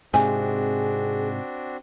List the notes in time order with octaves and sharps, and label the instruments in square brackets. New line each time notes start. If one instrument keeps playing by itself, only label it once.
[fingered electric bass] G#2 C3 [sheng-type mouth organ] C4 D4 F#4 [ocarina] G#4 [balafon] G#5